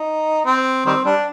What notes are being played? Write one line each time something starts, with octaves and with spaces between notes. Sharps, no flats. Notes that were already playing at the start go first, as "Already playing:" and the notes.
Already playing: D#4
C4
D#3 G3 C4
G3 D4